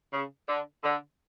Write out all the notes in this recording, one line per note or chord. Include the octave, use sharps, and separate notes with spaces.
C#3
D3
D3